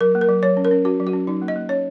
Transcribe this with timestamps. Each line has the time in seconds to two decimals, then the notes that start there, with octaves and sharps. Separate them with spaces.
0.01 F#3 A#4
0.15 A#3
0.21 A#4
0.29 F#3
0.42 F#3 C#5
0.57 C#4
0.65 A#4
0.71 C#4
0.85 C#4 F#4
1.00 F#3
1.07 F#4
1.13 C#4
1.27 F#3 D#4
1.42 A#3
1.48 D#5
1.56 A#3
1.69 C#4 C#5